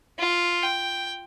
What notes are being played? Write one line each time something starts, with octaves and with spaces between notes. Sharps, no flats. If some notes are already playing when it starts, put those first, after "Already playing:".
F4
G5